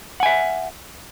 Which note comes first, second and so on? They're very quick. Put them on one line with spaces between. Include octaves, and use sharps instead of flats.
F#5 G#5 E5